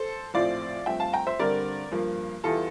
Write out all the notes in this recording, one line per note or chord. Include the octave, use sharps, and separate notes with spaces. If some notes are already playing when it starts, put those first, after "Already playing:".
Already playing: A4 C5
A#1 A2 F3 C4 D5 F5
G2 F3 A3 C4 E5 G5
F5 A5
G5 A#5
C5 E5
G2 D3 G3 C4 A#4 D5
G2 F3 A#3
E2 E3 G3 F4 A4